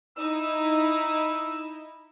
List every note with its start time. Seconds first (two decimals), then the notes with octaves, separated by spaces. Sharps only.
0.17 D#4 E4 E6